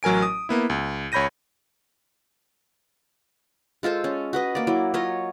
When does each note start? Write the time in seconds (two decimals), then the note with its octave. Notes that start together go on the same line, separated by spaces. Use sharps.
0.03 A1 F#3 A#4 G#5 D7
0.22 D#6
0.49 A#3 B3 E4
0.70 C#2
1.12 C#2 C#5 B5 G6 A#6 D#7
3.83 G#3 F4 A4 C5
4.04 C#4
4.33 F#4 B4 D#5
4.55 A#3 D5
4.67 F#3 E4
4.94 F#3 F4 C#5 D#5